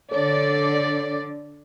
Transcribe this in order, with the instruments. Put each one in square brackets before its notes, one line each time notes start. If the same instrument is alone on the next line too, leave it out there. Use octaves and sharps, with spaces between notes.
[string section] D3 D5 [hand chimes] A4 C#5